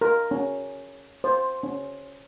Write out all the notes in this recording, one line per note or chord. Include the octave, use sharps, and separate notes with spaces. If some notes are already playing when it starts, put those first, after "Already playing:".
A#4
C#4
C5
C#4